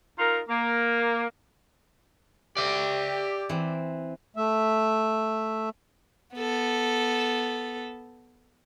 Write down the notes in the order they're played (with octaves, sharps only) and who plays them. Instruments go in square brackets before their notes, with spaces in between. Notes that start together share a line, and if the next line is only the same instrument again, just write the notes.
[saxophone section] D#4 F4 A#4
A#3
[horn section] G4 [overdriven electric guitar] D5 E5
[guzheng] E3 C4
[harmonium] A3 E5
[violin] B3 A4